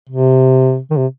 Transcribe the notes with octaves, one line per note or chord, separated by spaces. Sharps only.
C3
D#3
C3